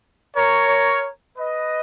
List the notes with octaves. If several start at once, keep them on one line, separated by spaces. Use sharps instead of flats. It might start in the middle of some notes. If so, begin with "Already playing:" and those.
A#4 C#5
B4 D#5